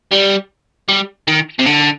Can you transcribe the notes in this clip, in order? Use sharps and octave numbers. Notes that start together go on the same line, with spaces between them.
G3
G3
D#3
C3
D3